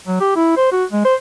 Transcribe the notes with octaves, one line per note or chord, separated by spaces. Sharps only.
F#3
G4
E4
C5
F#4
G#3
C5